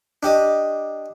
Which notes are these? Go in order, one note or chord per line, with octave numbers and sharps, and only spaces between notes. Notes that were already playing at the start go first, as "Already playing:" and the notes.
D4 G4 D#5